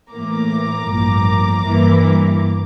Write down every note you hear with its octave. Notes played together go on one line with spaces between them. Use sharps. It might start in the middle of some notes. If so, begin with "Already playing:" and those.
A2 E3 A#3 A#5 D6
A1 G2 F3 A#3
G2 E3 A#3